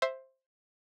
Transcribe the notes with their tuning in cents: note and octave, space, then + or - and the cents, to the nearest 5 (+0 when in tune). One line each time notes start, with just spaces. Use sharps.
C5 +10 E5 +0